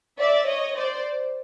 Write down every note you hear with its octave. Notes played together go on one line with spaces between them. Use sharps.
D5 E5
C#5 D#5
C5 D5